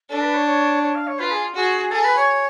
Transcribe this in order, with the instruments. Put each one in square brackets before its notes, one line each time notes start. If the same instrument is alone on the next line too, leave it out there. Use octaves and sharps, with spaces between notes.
[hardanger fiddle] D4 [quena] A4
[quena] B4
C#5
C#5
C#5
F5
C#5
[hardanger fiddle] F4 [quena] B4
[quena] G#4
[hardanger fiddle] F#4 [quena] G#4
[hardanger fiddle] G#4 [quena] A4
[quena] B4
C#5